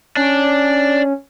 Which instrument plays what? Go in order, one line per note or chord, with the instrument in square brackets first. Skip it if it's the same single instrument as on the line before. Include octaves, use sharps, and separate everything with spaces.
[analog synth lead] C#4 [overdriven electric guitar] D4